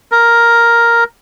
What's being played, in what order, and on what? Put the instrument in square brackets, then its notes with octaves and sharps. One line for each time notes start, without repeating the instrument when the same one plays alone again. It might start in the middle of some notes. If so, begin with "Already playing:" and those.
[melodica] A#4